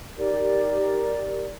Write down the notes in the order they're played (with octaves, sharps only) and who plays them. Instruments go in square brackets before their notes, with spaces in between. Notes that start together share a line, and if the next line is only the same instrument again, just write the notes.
[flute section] D#4 G4 A#4 D5